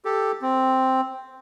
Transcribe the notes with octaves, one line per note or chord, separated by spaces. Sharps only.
G4 A4
C4